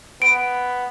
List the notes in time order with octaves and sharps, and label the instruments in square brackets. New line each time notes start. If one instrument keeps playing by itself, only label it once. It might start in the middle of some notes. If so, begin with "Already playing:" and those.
[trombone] B3 [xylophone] D7